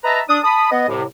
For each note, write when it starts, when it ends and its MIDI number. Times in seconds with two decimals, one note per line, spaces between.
0.04 0.20 71
0.04 0.20 75
0.04 0.20 76
0.04 0.20 81
0.04 0.20 82
0.29 0.38 62
0.29 0.38 87
0.44 0.70 81
0.44 0.70 83
0.44 0.70 87
0.72 0.85 59
0.72 0.85 75
0.88 1.03 36
0.88 1.03 45
0.88 1.03 48